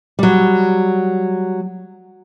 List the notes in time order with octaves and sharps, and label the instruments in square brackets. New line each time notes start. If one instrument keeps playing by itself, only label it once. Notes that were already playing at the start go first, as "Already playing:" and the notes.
[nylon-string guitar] F#3 G3